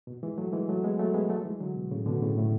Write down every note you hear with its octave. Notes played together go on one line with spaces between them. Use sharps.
B2
E3 G#3
F#3 A3
E3 G#3
F#3 A3
G#3 B3
F#3 A3
G#3 B3
F#3 A3
E3 G#3
D3 F#3
B2
A2 C#3
B2 D3
A2 C#3
A2